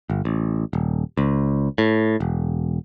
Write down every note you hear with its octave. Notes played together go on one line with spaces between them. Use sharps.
G1
A1
D#1
C#2
A2
E1